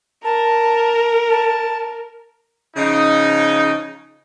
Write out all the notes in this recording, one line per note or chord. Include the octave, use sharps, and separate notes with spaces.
A#4 A5
A5
C#3 F3 D#4